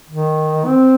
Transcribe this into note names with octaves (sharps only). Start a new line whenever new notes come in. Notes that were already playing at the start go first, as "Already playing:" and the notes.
D#3
C4